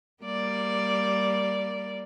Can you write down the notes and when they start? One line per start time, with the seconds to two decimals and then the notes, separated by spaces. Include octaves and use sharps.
0.23 G3 A#3 D5